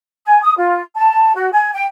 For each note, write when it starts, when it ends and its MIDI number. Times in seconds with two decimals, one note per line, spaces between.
0.25 0.41 80
0.42 0.55 87
0.56 0.80 65
0.95 1.32 81
1.34 1.49 66
1.52 1.69 80
1.73 1.84 79